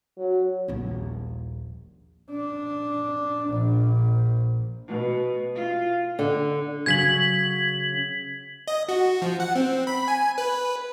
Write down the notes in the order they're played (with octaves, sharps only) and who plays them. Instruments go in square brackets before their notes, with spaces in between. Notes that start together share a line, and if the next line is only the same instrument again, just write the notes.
[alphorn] F#3
[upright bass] D#1 A#1
[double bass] D4
A#1
[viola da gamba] B2
F4
[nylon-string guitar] D3
[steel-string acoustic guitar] C#3 F#3 [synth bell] G#6 B6 F#7
[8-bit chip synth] D#5
F#4
F3
F#5
C4
B5
G#5
B4